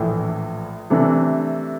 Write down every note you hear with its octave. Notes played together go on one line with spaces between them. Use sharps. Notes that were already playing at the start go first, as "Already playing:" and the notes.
Already playing: A#1 A2 E3 A3
C3 E3 A3 D4